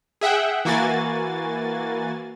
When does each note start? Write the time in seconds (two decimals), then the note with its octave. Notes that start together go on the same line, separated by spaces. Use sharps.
0.21 G#4 E5 F#5 G5
0.65 E3 A#3 F#4 G#5 A6